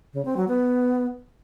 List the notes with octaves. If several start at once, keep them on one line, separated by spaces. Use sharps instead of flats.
C#3
C4
F#3
B3